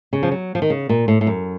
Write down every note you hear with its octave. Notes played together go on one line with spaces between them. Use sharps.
C#3
F3
F#3
F3
D#3
C#3
A#2
A2
A2
F#2